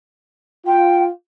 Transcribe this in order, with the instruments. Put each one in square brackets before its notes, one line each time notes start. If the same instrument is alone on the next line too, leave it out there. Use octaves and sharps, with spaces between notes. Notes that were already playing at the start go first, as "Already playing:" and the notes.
[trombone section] F4 [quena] G5